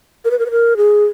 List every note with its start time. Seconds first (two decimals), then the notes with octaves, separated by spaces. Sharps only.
0.25 A#4
0.31 B4
0.39 A#4
0.46 B4
0.51 A#4
0.77 G#4